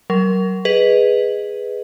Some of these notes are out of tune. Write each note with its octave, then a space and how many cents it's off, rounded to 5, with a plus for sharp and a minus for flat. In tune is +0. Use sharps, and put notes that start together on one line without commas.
F#3 +30 A#4 +0
G#4 -5 B4 +0 D#5 +0